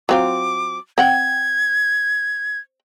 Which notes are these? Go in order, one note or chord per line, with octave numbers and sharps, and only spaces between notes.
F#3 C4 F4 D6
C4 F#5 G5 G#6